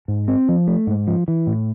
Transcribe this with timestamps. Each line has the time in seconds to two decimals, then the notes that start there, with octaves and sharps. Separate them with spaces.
0.08 G#2
0.28 C4
0.49 F3
0.67 A3
0.87 G#2
1.07 F3
1.28 E3
1.47 A2